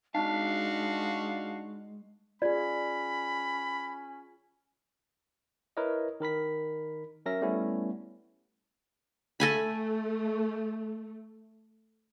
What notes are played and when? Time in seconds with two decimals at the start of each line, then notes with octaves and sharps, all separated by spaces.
0.15 G#3 D4 D#4 F#4 F5 A5
2.42 C#4 F4 G#4 D5 B5
5.77 E4 A#4 B4 C#5 D#5
6.20 D#3 A#4 B5 B6
7.26 F#3 C#4 A#4 E5 A#6
7.42 G3 A3 B3 C#4 E4
9.40 A3 A4 G#5 B5